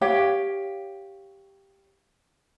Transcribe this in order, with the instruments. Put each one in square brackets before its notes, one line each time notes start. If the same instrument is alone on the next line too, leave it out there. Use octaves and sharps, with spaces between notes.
[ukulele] G4 C#5 F5